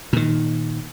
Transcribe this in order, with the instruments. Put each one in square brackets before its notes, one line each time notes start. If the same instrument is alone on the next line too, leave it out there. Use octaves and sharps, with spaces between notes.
[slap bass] A#2 D#3